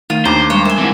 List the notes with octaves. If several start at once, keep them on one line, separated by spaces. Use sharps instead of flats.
D#3 A3 F4 D#7
D#2 D4 C5 A#5 D6
G3 G#3 C#5
A#4 E5 G#5
G#2 E3 C4 E4